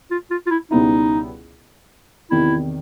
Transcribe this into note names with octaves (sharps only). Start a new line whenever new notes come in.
F4
F4
F4
E4
C#2 B2 G3 B3 D#4 E4
E2 C3 D#3 E4